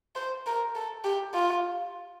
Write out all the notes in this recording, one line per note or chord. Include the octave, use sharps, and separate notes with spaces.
C5
A#4
A4
G4
F4